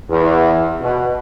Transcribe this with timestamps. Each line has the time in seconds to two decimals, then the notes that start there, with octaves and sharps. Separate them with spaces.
0.10 E2
0.81 B2